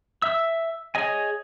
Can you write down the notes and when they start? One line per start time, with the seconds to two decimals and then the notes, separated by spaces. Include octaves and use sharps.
0.22 E5 E6
0.95 G#4 C#5 D#5 G#5